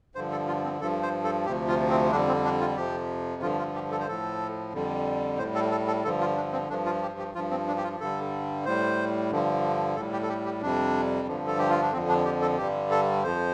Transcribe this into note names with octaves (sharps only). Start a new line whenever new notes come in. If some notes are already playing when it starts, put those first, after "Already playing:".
G2 D3 F3 C5
A4
F4
C4
G2 F3 A4
C5
A4
D2 C3 F3 G4
F4
C4
F2 D3 G3 D4
C4
D4
F4
F2 C3 F3 G4
G2 D3 F3 F4
F4
G4
A4
C5
A2 F3 A4
F2 D3 G3
A2 G3 C5
A4
A4
A4
G2 D3 F3 A4
F4
D4
C4
G2 F3 D4
F4
G4
G4
G2 F3 F4
C4
D4
G4
F4
G2 D3 G3 A4
A2 G3 C5
G2 D3 F3
A2 G3 A4
G4
A4
G4
G4
F2 C3 G3 D4
G2 D3 F3
A4
G4
F4
D4
F2 D3 F3 C4
D4
G4
A4
G2 D3 G3 G4
A4
F2 F3 C5